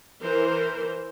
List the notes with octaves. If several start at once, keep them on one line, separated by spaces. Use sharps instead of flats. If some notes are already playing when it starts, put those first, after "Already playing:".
E3 A#4 C5